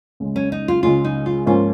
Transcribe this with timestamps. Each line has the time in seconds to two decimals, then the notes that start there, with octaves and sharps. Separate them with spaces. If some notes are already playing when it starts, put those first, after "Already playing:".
0.20 C#2 C#3 G#3
0.36 C#4
0.52 D#4
0.68 F4
0.83 C#2 C#3 G#3 C#4 F4
1.04 D#4
1.26 F4
1.46 G#2 F3 A#3 C#4 F4